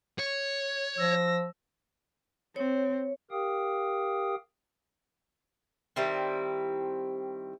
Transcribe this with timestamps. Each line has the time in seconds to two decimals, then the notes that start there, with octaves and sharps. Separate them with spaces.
0.19 C#5
0.98 F3 E6 A#6
2.56 C4 C#5
3.31 G4 A#4 F5 G5 D#6
5.96 D#3 G3 C4 E4